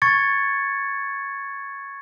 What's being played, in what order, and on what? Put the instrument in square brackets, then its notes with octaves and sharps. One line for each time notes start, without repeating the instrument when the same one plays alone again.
[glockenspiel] C#6 G#6 A6 C#7